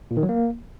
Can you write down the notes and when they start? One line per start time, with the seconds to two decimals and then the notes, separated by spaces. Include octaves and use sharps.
0.11 A#2
0.17 D#3
0.23 F#3
0.29 A#3